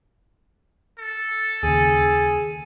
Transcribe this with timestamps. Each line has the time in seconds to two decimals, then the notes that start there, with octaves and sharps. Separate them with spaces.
0.99 A4
1.63 D#2 C#3 G#4